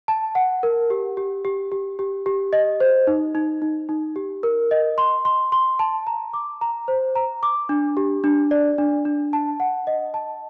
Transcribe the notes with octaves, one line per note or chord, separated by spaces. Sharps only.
A5
F#5
A#4
G4
G4
G4
G4
G4
G4
D#5
C5
D#4
D#4
D#4
D#4
G4
A#4
D#5
C6
C6
C6
A5
A#5
D6
A#5
C5
A#5
D6
D4
G4
D4
D5
D4
D4
A5
F#5
D#5
A5